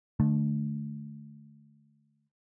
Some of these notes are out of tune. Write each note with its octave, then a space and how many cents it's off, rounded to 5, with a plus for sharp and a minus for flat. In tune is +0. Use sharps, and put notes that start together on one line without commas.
D3 +0 A3 -25